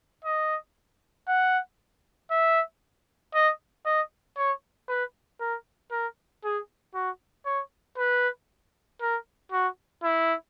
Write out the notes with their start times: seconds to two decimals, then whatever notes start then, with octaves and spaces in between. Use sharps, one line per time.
0.25 D#5
1.28 F#5
2.31 E5
3.35 D#5
3.86 D#5
4.37 C#5
4.89 B4
5.41 A#4
5.92 A#4
6.44 G#4
6.95 F#4
7.46 C#5
7.98 B4
9.01 A#4
9.52 F#4
10.04 E4